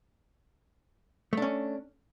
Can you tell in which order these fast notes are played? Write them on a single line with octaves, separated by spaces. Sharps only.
A3 D4 C#4